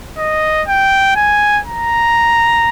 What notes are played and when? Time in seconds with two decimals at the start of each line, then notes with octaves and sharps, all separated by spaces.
0.18 D#5
0.68 G5
1.16 G#5
1.65 A#5